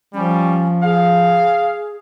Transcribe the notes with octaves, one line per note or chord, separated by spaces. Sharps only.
F3 G3 C#4
G#4 F5